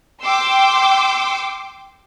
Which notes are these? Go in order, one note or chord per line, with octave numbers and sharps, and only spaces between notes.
G5 C6 D6 E6